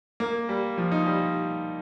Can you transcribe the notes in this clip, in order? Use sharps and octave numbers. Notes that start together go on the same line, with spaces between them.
A#3
G3
F3
D#4
G3